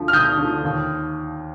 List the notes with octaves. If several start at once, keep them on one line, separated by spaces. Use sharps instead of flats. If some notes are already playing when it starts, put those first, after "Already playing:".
Already playing: D2 D3 F3
F6
D2 D#6 G6
D3 F3
D#2